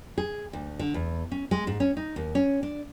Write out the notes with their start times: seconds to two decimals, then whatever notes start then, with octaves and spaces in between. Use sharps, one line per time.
0.18 G#4
0.53 D2
0.79 D3
0.94 E2
1.31 C#4
1.51 G#3
1.67 G#2
1.80 C#4
1.97 D#4
2.16 D#2
2.35 C#4
2.63 D4